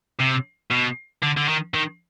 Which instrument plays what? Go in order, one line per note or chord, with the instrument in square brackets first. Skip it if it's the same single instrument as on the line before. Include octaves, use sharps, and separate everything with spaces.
[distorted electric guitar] C3
B2
D3
D3
D#3
D#3